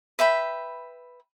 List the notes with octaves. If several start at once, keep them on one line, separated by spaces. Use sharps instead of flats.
B4 E5 G5 B5